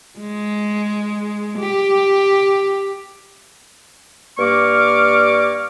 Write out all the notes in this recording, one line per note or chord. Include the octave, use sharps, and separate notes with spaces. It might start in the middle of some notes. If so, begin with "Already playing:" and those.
G#3
G4
G2 A#3 D5 C#6 D6 F6